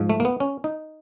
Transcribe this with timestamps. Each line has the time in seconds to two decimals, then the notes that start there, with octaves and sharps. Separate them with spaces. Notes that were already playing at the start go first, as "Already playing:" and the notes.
Already playing: G#2 F3
0.10 A3
0.20 A#3
0.25 B3
0.40 C#4
0.64 D#4